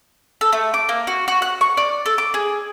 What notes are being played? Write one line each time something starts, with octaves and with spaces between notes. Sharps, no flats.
A4
A3
D6
A#3
F#4
F#4
F#6
C#6
D5
A4
D6
G#4